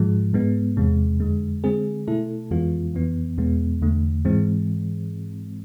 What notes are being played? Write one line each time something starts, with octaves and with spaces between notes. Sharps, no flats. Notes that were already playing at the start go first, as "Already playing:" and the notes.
Already playing: G#2 F3 G#3
G#2 G#3 B3
E2 C3 G#3
F2 D3 G#3
D3 G#3 C4 G#4
B2 A3 E4 A4
F2 E3 G#3 B3 F4
F2 E3 B3
E2 B2 G#3 B3
E2 D3 A3
G#2 E3 G#3 C4